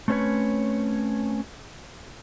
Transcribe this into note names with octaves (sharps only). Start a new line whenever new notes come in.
A3 C4 C#4 A4 B4 C#5